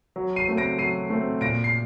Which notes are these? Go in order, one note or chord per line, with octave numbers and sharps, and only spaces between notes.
F#3
C7 D#7
A3 C4
A#6 D7
F#3 C7 D#7
A3 C4
A#2 A#6 D7
C7